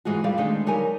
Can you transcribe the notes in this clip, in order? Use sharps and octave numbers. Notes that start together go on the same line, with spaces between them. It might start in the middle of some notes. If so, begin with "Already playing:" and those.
G#2 E3 G#3 F4 F#4
F2 G3 D5 F5
D2 D#3 G#3 D4
F#3 G3 D#4 A#4 G#5